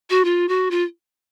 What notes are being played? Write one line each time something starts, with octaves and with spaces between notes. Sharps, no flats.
F#4
F4
F#4
F4